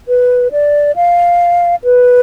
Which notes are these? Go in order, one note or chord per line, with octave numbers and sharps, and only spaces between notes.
B4
D5
F5
B4